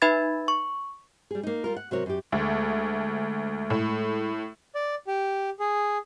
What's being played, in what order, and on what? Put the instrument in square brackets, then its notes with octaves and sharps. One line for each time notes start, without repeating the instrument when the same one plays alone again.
[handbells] D#4 B4 E5 B5 G#6 A6
C#6
[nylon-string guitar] G3 G#4
A#3 D#4
G3 F4 A#4
F#5
C3 F#3 F#4 A#4 C#5
F#2 G4
[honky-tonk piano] D2 [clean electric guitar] G#3 A3
[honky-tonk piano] A2
[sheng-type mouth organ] D5
G4
G#4